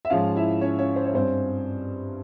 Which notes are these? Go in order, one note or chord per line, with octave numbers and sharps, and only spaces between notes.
E5
G#2 F3 G#3 C#4 F4 F5
E4 E5
C#4 C#5
C#4 C#5
C5
C#5
G2 G3 C4 C#4 C5